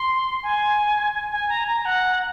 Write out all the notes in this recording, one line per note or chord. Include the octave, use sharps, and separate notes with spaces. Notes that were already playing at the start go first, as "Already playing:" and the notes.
Already playing: C6
G#5
G#5
A#5
A#5
F#5